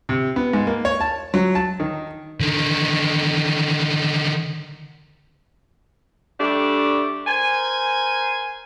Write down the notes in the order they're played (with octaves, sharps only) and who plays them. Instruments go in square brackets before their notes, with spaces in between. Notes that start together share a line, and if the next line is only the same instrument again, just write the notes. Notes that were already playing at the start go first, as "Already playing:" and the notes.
[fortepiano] C3
B3
G#2
A#3
C#5
A5
F#3
A5
D#3
[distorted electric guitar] D3 D#3
[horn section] G3 A3 D4 G4
A#4 C5 G#5